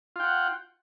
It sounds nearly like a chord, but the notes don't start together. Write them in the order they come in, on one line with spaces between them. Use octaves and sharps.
F4 G5 F#5